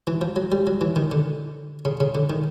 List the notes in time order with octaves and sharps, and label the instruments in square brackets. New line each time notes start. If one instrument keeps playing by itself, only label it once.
[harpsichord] E3
F3
F#3
G3
F#3
E3
D#3
D3
C#3
C#3
D3
D#3